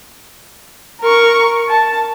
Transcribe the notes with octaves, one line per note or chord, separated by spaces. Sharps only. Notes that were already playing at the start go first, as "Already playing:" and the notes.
A#4 C#6
A5